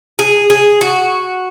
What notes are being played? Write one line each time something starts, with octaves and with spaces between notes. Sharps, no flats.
G#4
G#4
F#4